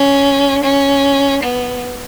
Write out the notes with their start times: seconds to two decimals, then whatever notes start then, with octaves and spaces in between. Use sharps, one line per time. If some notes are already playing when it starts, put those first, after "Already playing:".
Already playing: C#4
0.63 C#4
1.43 B3